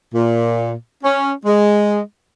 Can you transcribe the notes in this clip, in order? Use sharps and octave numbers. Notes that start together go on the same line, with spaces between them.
A#2
C#4
G#3